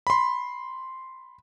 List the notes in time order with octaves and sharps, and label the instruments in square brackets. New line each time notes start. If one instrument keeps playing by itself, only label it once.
[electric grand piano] B5 C6